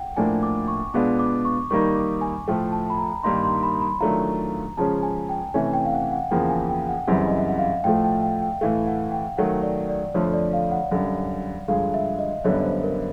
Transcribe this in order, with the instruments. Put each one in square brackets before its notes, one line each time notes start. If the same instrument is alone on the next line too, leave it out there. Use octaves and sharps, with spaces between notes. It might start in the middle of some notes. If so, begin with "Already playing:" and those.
Already playing: [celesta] F#5 G5
[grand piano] A2 F3 A#3 D4 [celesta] G#5
[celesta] D6
C#6
[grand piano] B2 G#3 B3 D4 F4 [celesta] D6
[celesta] D6
C#6
[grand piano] D#3 G3 A#3 D#4 [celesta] C#6
[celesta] D6
G#5
[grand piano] A2 F3 A3 [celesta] G5
[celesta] A5
B5
A#5
[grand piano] G2 D#3 G3 A#3 D#4 [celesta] C6
[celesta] C6
B5
B5
[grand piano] D#3 F#3 A3 D4 F4 [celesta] A#5
[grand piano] C#3 F3 G#3 C#4 [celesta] A5
[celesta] G#5
G5
[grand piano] C3 E3 A3 C#4 [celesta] G#5
[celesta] G5
F5
F#5
F#5
[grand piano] E2 C#3 F3 A#3 [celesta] G5
[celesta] G#5
G5
F#5
[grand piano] F#2 C#3 E3 G3 C4 [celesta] F#5
[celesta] D#5
E5
F#5
F5
[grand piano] A2 F3 A3 [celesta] G5
[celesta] G5
G5
G5
[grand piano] A2 E3 A3 [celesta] F5
[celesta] F#5
G5
[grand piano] D#3 F#3 A3 [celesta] F#5
[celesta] D5
D5
[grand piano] F2 D3 F3 A3 [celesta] C#5
[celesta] D5
F5
F#5
[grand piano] F#2 D3 G3
[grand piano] G2 D3 F3 G#3 [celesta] F5
[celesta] E5
D#5
[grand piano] F#2 D3 G3 B3 [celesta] C#5
[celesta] C5
A#4